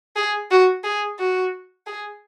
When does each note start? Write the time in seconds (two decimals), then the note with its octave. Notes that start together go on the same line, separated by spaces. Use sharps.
0.16 G#4
0.51 F#4
0.84 G#4
1.19 F#4
1.87 G#4